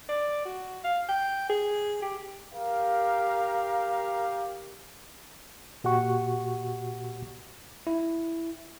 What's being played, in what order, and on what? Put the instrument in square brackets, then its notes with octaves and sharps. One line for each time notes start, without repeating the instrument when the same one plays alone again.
[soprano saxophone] D5
F#4
F5
G5
G#4
G4
[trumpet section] G4 A#4 F5
[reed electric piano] A#2 F#4 G4 F#5 C#6
[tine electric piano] E4